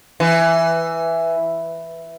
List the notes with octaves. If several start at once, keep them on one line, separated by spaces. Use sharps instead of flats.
E3